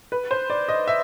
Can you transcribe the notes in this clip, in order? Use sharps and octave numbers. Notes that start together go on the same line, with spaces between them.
B4
C5
D5
D#5
E5